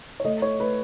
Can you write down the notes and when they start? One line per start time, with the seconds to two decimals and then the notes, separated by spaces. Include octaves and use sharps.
0.20 C#5
0.25 A3 D#5
0.42 C#5
0.60 A3 B4